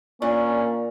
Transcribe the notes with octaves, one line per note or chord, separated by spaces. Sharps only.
A#2 A#3 C#4 D4 A#4